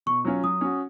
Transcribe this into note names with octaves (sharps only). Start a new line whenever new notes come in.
B2 C#6
F#3 C#4 F4
F#3 D#6
C#4 F#4